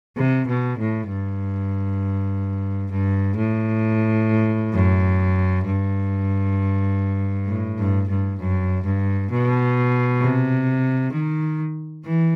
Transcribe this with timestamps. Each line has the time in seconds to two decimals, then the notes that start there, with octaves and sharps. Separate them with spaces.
0.17 C3
0.48 B2
0.79 A2
1.08 G2
2.91 G2
3.36 A2
4.73 F#2
5.65 G2
7.48 A2
7.78 G2
8.09 G2
8.39 F#2
8.84 G2
9.31 B2
10.21 C3
11.12 D#3
12.05 E3